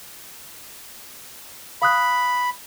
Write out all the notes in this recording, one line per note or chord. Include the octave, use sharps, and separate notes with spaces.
F5 B5 D#6 F#6